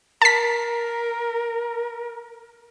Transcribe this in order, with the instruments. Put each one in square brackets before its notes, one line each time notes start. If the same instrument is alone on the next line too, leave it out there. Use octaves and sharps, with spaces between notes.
[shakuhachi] A#4 [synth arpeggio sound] A5 B6